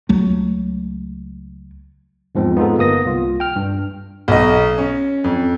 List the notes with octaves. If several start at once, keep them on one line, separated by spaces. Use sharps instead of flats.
C#2 F#3 A3
E2 G#2 F3 G#3 C4
B3 D#4 F4 G#4 A4
G1 A#3 B3 D#6 A#6
C2 F4
G5 F6
G2
B1 D#5
C#4
F2